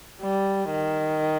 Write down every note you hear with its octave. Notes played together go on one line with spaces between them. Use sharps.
G3
D#3